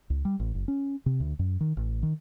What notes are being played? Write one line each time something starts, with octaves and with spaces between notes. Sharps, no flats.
C#2
G3
A1
F#1
C#4
C3
D2
F#2
D#3
A1
D#3